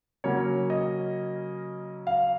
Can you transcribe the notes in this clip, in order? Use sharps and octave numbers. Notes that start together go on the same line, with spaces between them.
C#3 F#3 A#3 C#4 C#5
D#5
F5